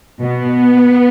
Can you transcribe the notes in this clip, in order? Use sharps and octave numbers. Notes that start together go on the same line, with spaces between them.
B2 B3